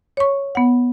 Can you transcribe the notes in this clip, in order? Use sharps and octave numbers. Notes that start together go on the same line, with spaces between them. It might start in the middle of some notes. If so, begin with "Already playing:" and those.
C#5 C#6
B3 F#5